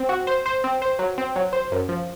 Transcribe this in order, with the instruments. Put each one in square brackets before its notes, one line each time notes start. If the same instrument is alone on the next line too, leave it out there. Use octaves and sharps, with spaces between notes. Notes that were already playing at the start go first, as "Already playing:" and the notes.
Already playing: [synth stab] C4
F#4
C5
C5
C4
C5
F#3
C4
F#3
C5
F#2
F3